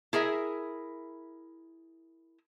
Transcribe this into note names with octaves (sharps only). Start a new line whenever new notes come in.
E4 G#4 A#4 E5